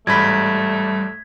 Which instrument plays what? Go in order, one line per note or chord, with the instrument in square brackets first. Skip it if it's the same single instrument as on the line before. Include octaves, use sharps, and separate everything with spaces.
[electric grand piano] A1 G#2 B5 [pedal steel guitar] G3 [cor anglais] A3 [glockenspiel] G#6 B6